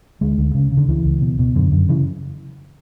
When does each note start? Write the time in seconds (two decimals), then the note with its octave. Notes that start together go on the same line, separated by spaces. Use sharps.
0.21 D2 G#3
0.38 D2
0.55 C#3
0.72 C#3
0.77 D3
0.88 C#2 E3
1.05 C#2
1.21 B2
1.39 B2
1.55 F#2 D3
1.72 F#2
1.89 C#3 E3